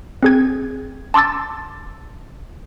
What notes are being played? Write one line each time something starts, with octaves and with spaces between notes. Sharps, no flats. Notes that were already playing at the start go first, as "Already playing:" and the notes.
C4 G#4 G#6
A5 C6 D6 E6 A6